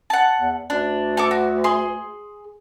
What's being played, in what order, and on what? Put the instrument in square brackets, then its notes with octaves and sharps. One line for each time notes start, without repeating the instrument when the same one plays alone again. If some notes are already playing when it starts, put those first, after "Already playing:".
[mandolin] F#5 A5
[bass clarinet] E2
[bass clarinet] D2 [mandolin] D4
[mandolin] A4 C#6 D6
F#4
G#4 C6